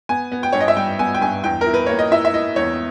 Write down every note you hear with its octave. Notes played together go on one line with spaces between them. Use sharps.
B3 G#5
B3
G5
G2 C#5
D#5
E5
G3 G5
B3 G#5
G5
G2 G#5
E2 G5
A#4
E4
B4
A#3 C#5
D#5
E4 E5
E5
E4 D#5
E2 C#5